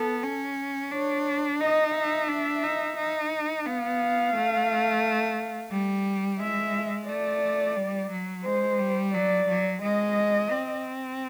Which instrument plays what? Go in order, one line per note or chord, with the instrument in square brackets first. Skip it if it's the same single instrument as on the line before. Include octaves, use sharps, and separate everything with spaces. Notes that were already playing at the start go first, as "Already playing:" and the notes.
Already playing: [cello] B3 [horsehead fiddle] A4
[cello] C#4
[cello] D4 [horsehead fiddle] C#5
[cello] D#4 [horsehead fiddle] D#5
[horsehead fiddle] E5
[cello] D4
D#4
D#4
[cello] B3 [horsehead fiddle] F5
[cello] A3
G3
[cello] G#3 [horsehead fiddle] E5
[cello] A3 [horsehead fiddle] D5
[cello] G3
F#3
[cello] G#3 [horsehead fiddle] C5
[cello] G3
[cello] F#3 [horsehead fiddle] D5
[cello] F#3
[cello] G#3 [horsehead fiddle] D#5
[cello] C4